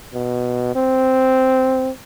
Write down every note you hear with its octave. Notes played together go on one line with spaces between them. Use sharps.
B2
C4